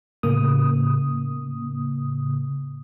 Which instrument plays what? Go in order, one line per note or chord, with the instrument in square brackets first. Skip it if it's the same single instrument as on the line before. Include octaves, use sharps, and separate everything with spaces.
[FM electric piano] A2 C#3 A#3 D#6